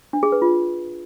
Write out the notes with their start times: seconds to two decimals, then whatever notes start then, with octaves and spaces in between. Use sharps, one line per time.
0.13 D4
0.23 G#4
0.32 B4
0.42 F4